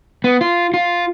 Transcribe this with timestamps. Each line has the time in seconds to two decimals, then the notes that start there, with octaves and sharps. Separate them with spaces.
0.24 B3
0.41 F4
0.74 F4